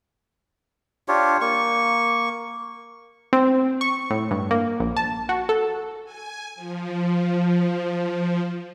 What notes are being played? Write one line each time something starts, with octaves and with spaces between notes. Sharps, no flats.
D4 F4 G4 C#5
A#3 C#6
C4
C#6
A2
G2
A#3
A#1
A5
F#4
A4
G#5
F3